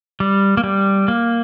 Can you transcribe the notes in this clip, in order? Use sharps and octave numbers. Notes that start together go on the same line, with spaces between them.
G3
A#3
G3
A#3